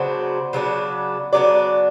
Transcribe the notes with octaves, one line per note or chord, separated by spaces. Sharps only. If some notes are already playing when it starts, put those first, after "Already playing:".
Already playing: C#3 F#3 B3 D4 C5
C#3 F#3 B3 D4
C#3 F#3 B3 D4 D5